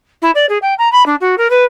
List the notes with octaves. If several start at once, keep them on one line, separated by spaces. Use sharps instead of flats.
E4
D5
G#4
G5
A#5
B5
D4
F#4
A#4
B4